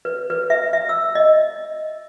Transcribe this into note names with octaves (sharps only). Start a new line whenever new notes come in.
B4
B4
E5
E5
E6
D#5